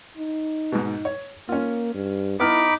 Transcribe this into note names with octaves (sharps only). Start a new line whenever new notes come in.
D#4
G#2 B2
C#5
A#3 C#4 F4
G2
B3 D#4 E4 B5 D6 F6